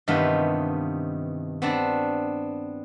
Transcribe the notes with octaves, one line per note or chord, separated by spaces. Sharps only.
G2 C3 D#3 E3 B3 F4
B3 C4 D4 D5